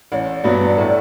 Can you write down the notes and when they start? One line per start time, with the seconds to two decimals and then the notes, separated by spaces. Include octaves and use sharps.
0.12 A1 D5
0.44 G2 F#3 B3
0.77 A2